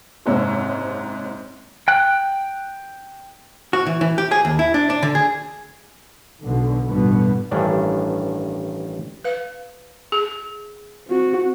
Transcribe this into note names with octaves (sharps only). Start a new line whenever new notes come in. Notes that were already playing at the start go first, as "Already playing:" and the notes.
F#1 G#2 C3 C#5 E6
G5 F#6
F#4
E3
E3
G4
G#4
D#2
E4
D4
D4
D3
G#4
B1 B2 D3
A1 G2 B2 D3 B3
A1 G2 D#3 C#4 D4
B4 F5
G#4
C4 F#4